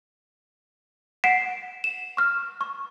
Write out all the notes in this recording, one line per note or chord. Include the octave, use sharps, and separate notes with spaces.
F#5 B6 C7 D7 E7
E7
C#6 F6
C#6